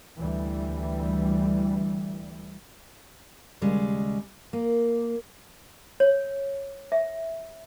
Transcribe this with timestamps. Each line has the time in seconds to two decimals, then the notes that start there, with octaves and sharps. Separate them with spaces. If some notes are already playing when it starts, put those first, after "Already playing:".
0.19 D2 E3 G3
3.61 D#2 C#3 G3 G#3
4.53 A#3
6.00 C#5
6.92 E5